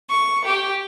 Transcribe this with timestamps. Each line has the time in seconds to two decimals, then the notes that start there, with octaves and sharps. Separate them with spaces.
0.10 C#6
0.45 G4